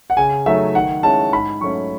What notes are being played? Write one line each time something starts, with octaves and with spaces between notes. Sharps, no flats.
F#5
C#3 G#5
F#3 A3 D#4 E5
D#3 F#5
G#3 C#4 E4 A5
G#2 B5
F#3 A3 C#4 C#6